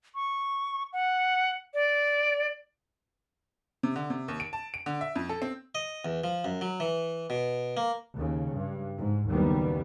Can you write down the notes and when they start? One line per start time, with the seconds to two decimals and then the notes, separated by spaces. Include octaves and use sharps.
0.15 C#6
0.93 F#5
1.74 D5
3.83 C3
3.96 D3
4.10 C3
4.28 D#2
4.40 D7
4.53 A5
4.74 D7
4.86 D3
5.01 E5
5.16 F2
5.29 A4
5.42 C4
5.75 D#5
6.05 E2
6.24 F3
6.45 F#2
6.61 F#3
6.80 E3
7.30 B2
7.77 A#3
8.16 D#2 C#3
8.56 G2
8.97 G#2
9.30 F#1 D#2 G3 B3